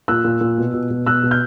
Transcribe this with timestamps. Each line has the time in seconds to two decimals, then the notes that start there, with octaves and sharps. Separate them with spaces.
0.08 A#2 E6 F#6
0.25 A#2
0.41 A#2
0.58 B2
0.74 B2
0.90 B2
1.06 B2 E6 F#6
1.23 B2
1.31 F6 G6